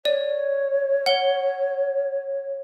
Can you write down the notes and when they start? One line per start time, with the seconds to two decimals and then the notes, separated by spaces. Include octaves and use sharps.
0.05 C#5 D5
1.06 F#5 G7